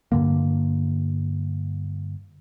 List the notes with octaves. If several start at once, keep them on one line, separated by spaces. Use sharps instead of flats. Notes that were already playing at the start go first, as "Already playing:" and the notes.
G2 D3 A#3